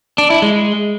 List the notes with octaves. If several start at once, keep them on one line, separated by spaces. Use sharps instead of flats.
D4
E4
G#3